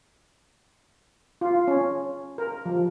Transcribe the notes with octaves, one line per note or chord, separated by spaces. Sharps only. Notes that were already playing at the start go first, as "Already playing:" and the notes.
F4
C#4
A#4
F3